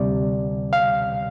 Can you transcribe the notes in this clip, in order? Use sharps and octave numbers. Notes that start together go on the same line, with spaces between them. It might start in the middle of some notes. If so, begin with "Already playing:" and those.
Already playing: D2 C3 G3 D5
F5